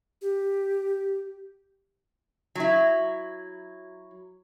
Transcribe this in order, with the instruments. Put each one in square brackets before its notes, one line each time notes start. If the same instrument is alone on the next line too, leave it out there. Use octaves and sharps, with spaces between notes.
[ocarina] G4
[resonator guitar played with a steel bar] F#3 E4